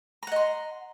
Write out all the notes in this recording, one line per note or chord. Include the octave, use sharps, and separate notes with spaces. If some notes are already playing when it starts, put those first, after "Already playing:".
D#5 F#5 A#5 C6